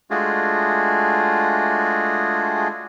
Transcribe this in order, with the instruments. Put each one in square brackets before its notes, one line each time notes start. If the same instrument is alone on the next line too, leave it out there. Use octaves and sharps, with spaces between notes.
[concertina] G#3 A3 D4 F4 F#4 G#4